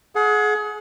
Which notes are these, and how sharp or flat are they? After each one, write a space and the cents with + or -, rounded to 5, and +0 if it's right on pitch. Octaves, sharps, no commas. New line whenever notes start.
G#4 +30 F#5 -20